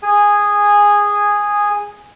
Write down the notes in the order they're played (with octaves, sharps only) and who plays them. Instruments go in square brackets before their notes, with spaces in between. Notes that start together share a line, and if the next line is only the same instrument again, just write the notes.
[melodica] G#4 G#5